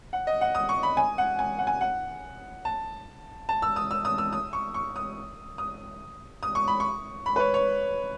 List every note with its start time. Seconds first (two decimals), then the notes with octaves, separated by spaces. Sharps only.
0.13 F#5
0.27 D#5
0.41 F#5
0.55 D#6
0.69 C#6
0.83 B5
0.97 G#5
1.18 F#5
1.39 G#5
1.59 F#5
1.67 G#5
1.81 F#5
2.65 A5
3.49 A5
3.62 E6
3.76 D#6
3.91 E6
4.05 D#6
4.18 E6
4.33 D#6
4.53 C#6
4.74 C#6
4.96 D#6
5.58 D#6
6.43 D#6
6.55 C#6
6.68 B5
6.80 C#6
7.26 B5
7.36 B4
7.40 C#5
7.54 C#5